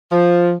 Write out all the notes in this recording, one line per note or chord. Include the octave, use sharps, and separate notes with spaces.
F3